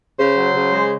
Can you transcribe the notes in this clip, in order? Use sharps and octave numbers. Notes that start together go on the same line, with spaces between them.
C#3 C5
F#3
C#3
G#3